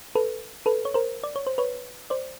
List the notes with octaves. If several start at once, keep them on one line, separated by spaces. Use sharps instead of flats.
A4 B4
A4 B4
C#5
A#4 C5
D5
C#5
C5
B4 C#5
C5 D5